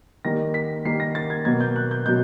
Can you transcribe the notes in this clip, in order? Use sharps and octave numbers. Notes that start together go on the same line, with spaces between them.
D#3 G3 A#3 A#6
B6
D#3 G3 A#3 C7
A#6
A6
G#6
B2 F#3 A#3 G#6
G6
F#6
G6
B2 F#3 G6